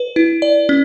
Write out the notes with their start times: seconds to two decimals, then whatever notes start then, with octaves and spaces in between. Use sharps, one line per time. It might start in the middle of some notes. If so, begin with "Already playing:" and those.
Already playing: B4
0.16 E4
0.42 D5
0.69 C#4